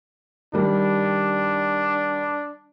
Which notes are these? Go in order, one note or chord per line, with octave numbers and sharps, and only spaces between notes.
D#3 G3 D4